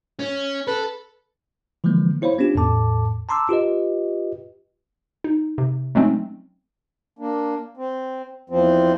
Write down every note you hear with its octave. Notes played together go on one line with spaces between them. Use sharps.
C#4
A4 B4
D3 E3 F3 G#3 A#3
B3 E4 C5 C#5 F5 B5
B3 C#4 D4 F4 G4
E2 A2 A4 A5 D6
A5 A#5 C6 D6 E6
F4 G4 B4 D#5
D#4
C3
F#3 G#3 A3 C4 C#4 D#4
A#3 D4
C4
E2 F3 C4